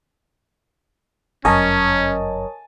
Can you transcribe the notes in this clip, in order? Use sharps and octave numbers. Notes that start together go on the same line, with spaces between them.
G1 F#2 C#4 A#4 C#5 D#5 G#5 A5